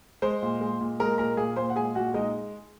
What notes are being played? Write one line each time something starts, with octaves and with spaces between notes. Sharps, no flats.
G#3 C5 C6
A#2
G#3
A#2
G#3 A#4 A#5
A#2 A#4 A#5
A#2 G#4 G#5
A#2 C5 C6
F#5
G#3 G#4 G#5
A#2 F#4 F#5
G#3 D#4 D#5